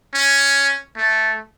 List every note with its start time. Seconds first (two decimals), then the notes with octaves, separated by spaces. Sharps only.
0.14 C#4
0.97 A3